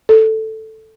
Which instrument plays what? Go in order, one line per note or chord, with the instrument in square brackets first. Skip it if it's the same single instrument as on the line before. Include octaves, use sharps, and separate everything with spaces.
[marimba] A4